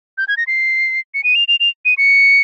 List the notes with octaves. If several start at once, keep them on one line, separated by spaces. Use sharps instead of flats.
G6
G#6
A#6
C7
C#7
D#7
F7
F7
F7
D#7
C#7